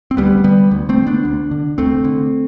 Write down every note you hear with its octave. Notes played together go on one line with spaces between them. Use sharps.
C4
D2 G3 B3
D3 G3 B3
D2
A3 C4
D3
B3 D4
D2
D3
D2 A3 C4
D3